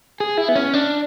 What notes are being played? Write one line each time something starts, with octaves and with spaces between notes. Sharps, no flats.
G#4
E4
B3
C#4
D4